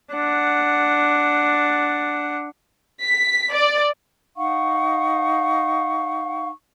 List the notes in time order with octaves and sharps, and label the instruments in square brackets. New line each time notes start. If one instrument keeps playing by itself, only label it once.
[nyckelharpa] D4 F#5
[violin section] B6
D5
[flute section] D#4 F5 F#5 C#6